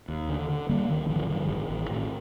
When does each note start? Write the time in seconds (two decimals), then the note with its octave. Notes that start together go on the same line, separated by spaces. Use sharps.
0.08 D#2
0.29 D3
0.49 D3
0.69 D3 G3 A#3
0.90 D2 D#3
1.09 A1 D3 F3
1.30 G2 D#3
1.49 A1 D#3
1.70 A1
1.90 A2